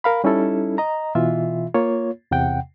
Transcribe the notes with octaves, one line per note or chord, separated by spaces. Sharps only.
A#4 F5 B5
G3 C#4 D#4 E4 A4
D#5 A#5
B2 E3 F4 E5
A#3 F4 C#5
E2 C3 F#5 G5